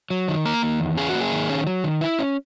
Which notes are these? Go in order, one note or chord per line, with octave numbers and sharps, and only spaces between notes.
F#3
D#3
A#3 A#4
D#3
E2
C#4 G#4
F#4
A#3
G#4
D#3
C#4
F#3
D#3
E4
C#4